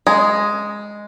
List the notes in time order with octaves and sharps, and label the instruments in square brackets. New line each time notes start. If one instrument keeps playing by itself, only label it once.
[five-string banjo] G#3